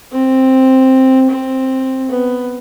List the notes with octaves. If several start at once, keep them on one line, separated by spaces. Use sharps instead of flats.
C4
C4
B3